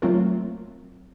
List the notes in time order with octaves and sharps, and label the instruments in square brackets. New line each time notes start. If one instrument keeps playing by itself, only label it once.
[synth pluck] F#3 A3 A#3 C4 F4 A#4